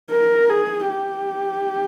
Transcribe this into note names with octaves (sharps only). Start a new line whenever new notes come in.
A#4
G#4
G4